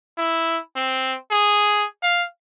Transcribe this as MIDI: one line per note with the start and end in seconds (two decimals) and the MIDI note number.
0.18 0.58 64
0.76 1.15 60
1.31 1.85 68
2.03 2.25 77